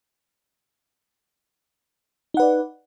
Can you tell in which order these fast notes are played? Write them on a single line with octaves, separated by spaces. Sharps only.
D#4 F#5 B4 D5